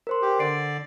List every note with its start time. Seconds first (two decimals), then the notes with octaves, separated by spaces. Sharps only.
0.07 A#4 C5 C6
0.22 G4
0.39 D3 D5 C7 D7